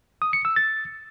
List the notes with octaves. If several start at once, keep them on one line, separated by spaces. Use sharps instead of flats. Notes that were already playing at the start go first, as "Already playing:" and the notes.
D#6
C#7
E6
A6